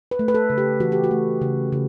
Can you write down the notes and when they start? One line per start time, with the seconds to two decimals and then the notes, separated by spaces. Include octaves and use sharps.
0.11 B4
0.19 A3
0.28 B4
0.35 A4
0.50 C#3
0.58 G4
0.80 E3 F#4
0.92 G4
1.04 F#4
1.11 A3
1.42 C#3
1.72 C#3